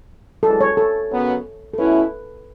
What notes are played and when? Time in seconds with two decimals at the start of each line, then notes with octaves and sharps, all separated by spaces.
0.43 F#2 E3 G#3 A4
0.61 C#5
0.77 A4
1.11 F#2 C#3 F#3 B3
1.74 A4
1.78 B2 A3 C#4 E4 B4